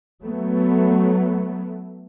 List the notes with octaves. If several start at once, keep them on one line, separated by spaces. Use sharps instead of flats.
F#3 A3 B3